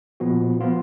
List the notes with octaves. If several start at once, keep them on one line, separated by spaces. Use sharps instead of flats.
A#2 F3 B3 F#4
F3 B3 F4